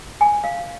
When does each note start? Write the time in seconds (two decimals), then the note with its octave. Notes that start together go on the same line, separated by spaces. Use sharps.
0.21 G#5
0.44 F5